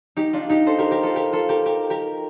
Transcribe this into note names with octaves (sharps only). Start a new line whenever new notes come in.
D#4 G4
D4 F4
D#4 G4
A4 C5
G4 A#4
G4 A#4
F4 A4
G4 A#4
F4 A4
G4 A#4
G4 A#4
G4 A#4